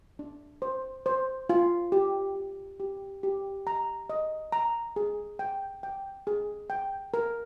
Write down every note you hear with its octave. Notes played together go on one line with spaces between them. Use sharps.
D4
C5
C5
F4
G4
G4
G4
G4
A#5
D#5
A#5
G#4
G5
G5
G#4
G5
A#4